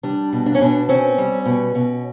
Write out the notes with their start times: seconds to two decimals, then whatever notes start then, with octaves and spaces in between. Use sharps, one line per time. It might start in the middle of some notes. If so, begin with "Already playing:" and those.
0.03 G3 D4
0.33 B2
0.46 D4
0.55 C#4
0.61 B2 D4
0.89 C4 C#4
1.18 G3
1.46 B2
1.75 B2